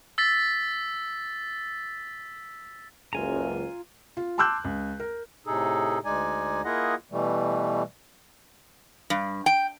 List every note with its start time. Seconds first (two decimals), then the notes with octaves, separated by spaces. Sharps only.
0.18 E6 A6 B6
3.13 F#1 C#2 F4 G#5 A#5
4.17 F4
4.38 A5 C6 D6 E6 F#6 G6
4.64 C#2
5.00 A#4
5.46 A2 C3 D#4 G#4 A4
6.05 D2 G#3 D#4 D5 G#5
6.64 A#3 E4 F4 G#4 D#5 F#5
7.11 B2 E3 G3 A3
9.10 G2
9.46 G5